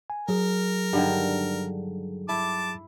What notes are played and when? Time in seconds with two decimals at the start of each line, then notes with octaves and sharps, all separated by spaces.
0.10 G#5
0.29 F#3 G#4 A#4
0.93 G2 D3 D#3
2.29 E4 A5 D6